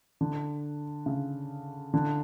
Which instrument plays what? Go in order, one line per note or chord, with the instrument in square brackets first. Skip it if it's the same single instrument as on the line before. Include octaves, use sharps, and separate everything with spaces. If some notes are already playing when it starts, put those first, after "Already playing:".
[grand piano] D3
C#3
D3